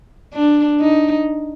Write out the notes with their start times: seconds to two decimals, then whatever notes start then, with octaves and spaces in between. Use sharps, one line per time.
0.34 D4
0.81 D#4